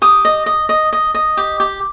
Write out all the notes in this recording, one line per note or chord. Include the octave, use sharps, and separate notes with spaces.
G4 D#6
D#5
D#5
D#5
D#5
D#5
G4
G4